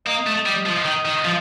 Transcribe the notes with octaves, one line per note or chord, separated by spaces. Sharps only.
A#3 D#5
A3
G3
F3
D#3
D#3
F3